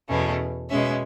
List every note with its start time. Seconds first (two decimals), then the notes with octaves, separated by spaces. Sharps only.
0.08 E2 B2 A3 C#4
0.69 B2 G#3 C#4 E5